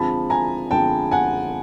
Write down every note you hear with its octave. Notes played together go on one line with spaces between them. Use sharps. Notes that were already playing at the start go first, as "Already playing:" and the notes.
Already playing: D3 F3 G#3 C4 A5 B5
G#5 A#5
D3 F3 G#3 C4 G5 A5
F#5 G#5